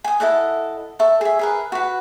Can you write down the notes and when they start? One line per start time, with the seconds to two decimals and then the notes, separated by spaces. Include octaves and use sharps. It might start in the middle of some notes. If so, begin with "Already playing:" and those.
0.04 G#5 D#6
0.20 E4 A4 D#5 F#5
0.99 A4 E5 C#6
1.21 G#4 E5
1.39 G#4 A#4 B4
1.72 F#4 B4